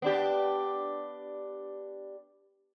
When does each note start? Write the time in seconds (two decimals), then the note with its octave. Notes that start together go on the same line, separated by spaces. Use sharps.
0.02 B3 D4 G4